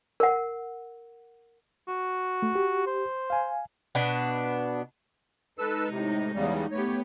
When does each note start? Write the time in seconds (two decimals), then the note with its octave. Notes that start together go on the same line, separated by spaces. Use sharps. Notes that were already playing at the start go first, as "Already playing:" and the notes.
0.20 A#4 F#5
1.88 F#4
2.42 A3
2.55 G4
2.87 C5
3.30 F5 G#5
3.95 B2 B3 D4
5.59 G#3 D#4 A4 B4 E6
5.91 A2 C3
6.34 E2 C#3 G3
6.72 A3 B3 G4 C#5